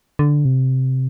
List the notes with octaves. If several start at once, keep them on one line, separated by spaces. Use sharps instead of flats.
D3
C3